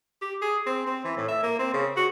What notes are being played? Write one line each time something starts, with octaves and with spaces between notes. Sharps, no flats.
G4
G#4
C4
C4
E3
A2
E5
A#3
C4
C#3
F#4